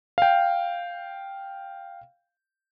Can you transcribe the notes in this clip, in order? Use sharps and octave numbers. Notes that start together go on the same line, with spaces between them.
F5 G5